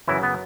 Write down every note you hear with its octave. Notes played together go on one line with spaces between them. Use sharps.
F#2 C#3 E3 F#3 E4
B3